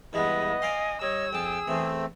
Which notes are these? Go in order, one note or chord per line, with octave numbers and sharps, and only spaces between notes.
E2 G2 G#3 B3 E4 D#5
D5 F5 G#5 C6
G3 C#5 D#5 E6
F2 G#4 G5 A5
E2 E3 A3 C4